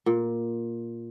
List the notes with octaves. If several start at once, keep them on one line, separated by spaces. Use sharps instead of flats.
A#2